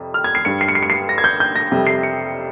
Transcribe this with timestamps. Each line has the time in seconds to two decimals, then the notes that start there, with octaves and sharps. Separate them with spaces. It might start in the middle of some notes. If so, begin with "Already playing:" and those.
Already playing: F2 C3 G3
0.14 F6
0.24 G#6
0.35 C7
0.45 G2 G3 C#7
0.61 C7
0.68 C#7
0.75 C7
0.83 C#7
0.90 C7
1.09 A#6
1.18 G#6
1.24 G6
1.40 G6
1.56 A#6
1.71 F2 C3 G3
1.87 C7
2.03 C#7